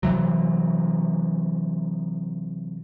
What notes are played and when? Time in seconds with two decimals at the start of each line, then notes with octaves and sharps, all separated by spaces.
0.03 C3 E3 F#3